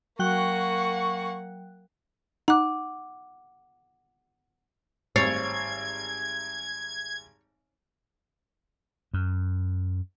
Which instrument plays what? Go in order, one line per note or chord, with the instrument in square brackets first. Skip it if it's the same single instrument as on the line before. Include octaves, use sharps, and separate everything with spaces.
[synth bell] F#3 G5 F#6 [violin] A#3 F#5 [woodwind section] C#6
[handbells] D#4 F#6 [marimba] F#5 D6
[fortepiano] G#1 G3 [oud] C#5 [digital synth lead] G#6 [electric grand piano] A6 C7
[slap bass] F#2